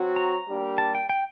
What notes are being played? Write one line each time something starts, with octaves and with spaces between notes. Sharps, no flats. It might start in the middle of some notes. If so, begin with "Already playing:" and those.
Already playing: F#3 C4 F#4
A#5
G3 A#3 D4 G4
A5
G5
G5